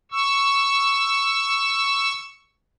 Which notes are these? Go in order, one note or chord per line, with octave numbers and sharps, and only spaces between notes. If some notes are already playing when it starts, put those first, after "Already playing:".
C#6 E6